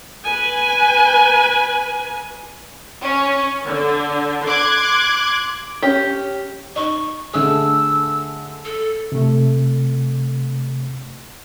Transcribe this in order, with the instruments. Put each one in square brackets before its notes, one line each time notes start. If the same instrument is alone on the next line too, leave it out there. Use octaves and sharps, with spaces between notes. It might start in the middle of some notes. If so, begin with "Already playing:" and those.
[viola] B4 G#5
[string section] C#4
D3
C6 D6 F#6 G#6
[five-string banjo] C#4 G4
[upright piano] D#4 [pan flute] C#6
[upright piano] D3 A3 G#4 [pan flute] E6
[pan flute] A4
[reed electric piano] C3 A3